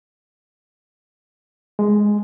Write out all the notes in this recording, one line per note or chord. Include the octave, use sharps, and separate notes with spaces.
G#3